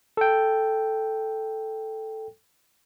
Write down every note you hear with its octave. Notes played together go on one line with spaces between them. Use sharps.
A4 G5